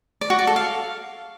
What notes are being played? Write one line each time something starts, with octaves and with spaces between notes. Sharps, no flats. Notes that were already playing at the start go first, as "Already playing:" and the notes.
D5
F#4
D5
A4
F5